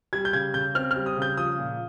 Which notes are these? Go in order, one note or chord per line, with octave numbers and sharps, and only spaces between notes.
G3 G#6
G6
C#3 G#6
C#3 G6
C4 F6
F6
G3
D#6
C#3
G6
F3 D#6
A#2